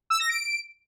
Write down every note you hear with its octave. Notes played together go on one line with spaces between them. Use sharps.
E6
A#6
D7